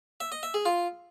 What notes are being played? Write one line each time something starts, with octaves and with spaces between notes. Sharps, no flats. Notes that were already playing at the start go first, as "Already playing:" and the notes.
E5
D#5
E5
G#4
F4